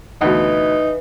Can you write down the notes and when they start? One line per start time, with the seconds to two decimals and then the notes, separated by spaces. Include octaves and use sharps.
0.21 D2 B2 E3 D#4